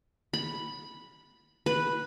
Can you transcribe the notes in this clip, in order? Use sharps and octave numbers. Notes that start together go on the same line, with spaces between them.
B5
B4